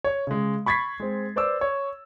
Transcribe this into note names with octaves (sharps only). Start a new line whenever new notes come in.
C#5 C#6
C#3 G#3
B5 C#6 G#6 A6 B6 C7
G#3 C4
B4 C5 D5 D6 E6
C#5